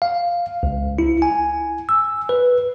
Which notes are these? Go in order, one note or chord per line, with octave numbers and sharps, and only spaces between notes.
F5
C#2
E4
G#5
E6
B4